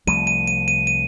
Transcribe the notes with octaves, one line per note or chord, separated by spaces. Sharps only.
C2 C3 F3 A3 D#7
D#7
D#7
D#7
D#7